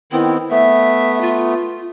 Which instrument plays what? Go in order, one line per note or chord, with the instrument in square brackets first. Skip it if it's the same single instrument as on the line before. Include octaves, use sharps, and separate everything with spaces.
[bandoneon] D#3 B3 C4 [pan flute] E4
[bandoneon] A3 B3 [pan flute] E5
[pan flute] F4